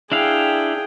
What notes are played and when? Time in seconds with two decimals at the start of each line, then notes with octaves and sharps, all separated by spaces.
0.12 D4 E4 G#4 F5 G5